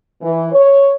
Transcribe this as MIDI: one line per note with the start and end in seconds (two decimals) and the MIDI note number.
0.22 0.49 52
0.52 0.92 73